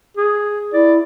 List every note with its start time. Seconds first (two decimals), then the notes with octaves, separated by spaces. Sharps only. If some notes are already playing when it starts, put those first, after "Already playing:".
0.17 G#4
0.73 E4 D5